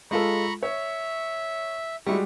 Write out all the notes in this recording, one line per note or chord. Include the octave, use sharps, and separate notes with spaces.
G#3 F4 A4 A#5 B5 C#6
C#5 E5
G3 G#3 E4 F#4 C#6